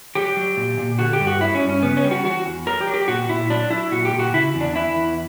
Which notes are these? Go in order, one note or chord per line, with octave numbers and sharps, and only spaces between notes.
F#3 G4
F#3
A#2
A#2
D3 F#4
G4
G2
F#4
F#3 E4
C#4
G2
C#4
C#3 B3
C#4
G3
F#4
E3 F#4
E2
F#3 A#4
G4
F#3
G4
A#2 F#4
A#2 E4
F#3 D4
F#3 E4
A#2 F#4
G4
A#2
F#4
C#3 E4
E2
D4
E3 E4
E2